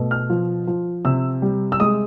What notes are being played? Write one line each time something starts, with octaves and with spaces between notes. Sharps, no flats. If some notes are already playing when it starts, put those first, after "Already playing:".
Already playing: B2 A3
F6
F3
F3
C3 E6
G3
E6
G#3 D#6